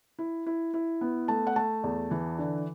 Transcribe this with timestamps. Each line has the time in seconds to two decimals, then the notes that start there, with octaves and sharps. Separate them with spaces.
0.19 E4
0.46 E4
0.74 E4
1.01 B3
1.28 A3 A5
1.47 F#5
1.56 A3 A5
1.84 E2
2.11 E3
2.39 D3